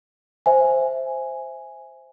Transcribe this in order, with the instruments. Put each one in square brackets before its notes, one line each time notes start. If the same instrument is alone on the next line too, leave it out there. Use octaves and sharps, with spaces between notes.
[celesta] C5 E5 G#5